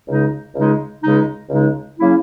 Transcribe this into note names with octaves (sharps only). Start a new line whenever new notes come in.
C#2 C#3 G#3 D#4
C#2 C#3 G#3 D#4
C#2 C#3 G#3 D#4
C#2 C#3 G#3 D#4
C#3 F#3 A#3 C#4 E4